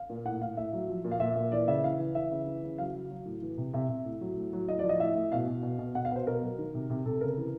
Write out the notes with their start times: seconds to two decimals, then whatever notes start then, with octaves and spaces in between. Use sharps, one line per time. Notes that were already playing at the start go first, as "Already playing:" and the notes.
Already playing: F5
0.10 A#2
0.25 A2 F#5
0.41 A2 F5
0.57 A2 E5
0.73 F#3
0.89 F3
1.04 A#2
1.11 F5
1.20 A#2 E5
1.36 A#2
1.52 E3 D5
1.68 C#3 E5
1.84 E3 F5
1.99 E3
2.15 E3 E5
2.31 C#3
2.47 E3
2.63 C#3
2.78 F#3 F5
2.94 F#3
3.10 F#3
3.25 A2
3.42 E3
3.57 C3
3.73 C3 E5
3.89 C3
4.05 A2
4.21 F#3
4.37 A2
4.53 F#3
4.68 A2 D#5
4.79 F3 D5
4.89 D#5
4.99 A2 E5
5.15 A2
5.32 B2 F5
5.47 B2
5.63 B2
5.79 B2
5.95 B2 F#5
6.05 F5
6.11 B2 B4
6.16 C5
6.27 B2 A#4
6.42 F#3
6.58 D#3
6.74 C3
6.90 C3
7.05 C3 A4
7.21 C#3 A#4
7.38 E3